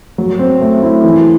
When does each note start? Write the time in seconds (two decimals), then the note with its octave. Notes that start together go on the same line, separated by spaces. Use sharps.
0.18 F#3
0.39 C4
0.61 A3
0.82 E4
1.04 E3